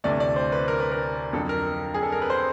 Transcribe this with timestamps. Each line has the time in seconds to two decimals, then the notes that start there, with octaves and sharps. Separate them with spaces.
0.04 D2 C3 E3 A3 D5
0.20 D5
0.36 C5
0.52 B4
0.68 A#4
0.80 B4
0.91 A#4
1.33 F2 D3 F#3 A4
1.49 A#4
1.94 G#4
2.03 A4
2.12 A#4
2.22 B4
2.30 C5